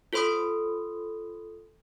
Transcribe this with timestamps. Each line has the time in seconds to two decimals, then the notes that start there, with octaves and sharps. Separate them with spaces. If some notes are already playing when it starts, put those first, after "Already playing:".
0.13 F4 A4 C5 B5 C6 D#6